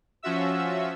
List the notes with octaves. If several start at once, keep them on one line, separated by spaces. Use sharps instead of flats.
F3 C#4 F4 F#4 E5 E6